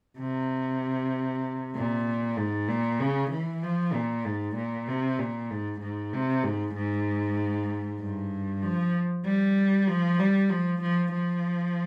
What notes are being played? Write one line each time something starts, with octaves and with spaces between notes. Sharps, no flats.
C3
A#2
G#2
A#2
C#3
E3
F3
A#2
G#2
A#2
C3
A#2
G#2
G#2
C3
G#2
G#2
G2
F3
G3
F3
G3
F3
F3
F3